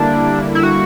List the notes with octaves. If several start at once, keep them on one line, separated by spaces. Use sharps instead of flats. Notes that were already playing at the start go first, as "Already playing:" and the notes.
Already playing: D3 G3 A#3 D4 E4
E4
F#4